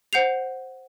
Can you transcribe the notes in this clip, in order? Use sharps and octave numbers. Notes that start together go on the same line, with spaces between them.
C5 F#5 G6 C7 F7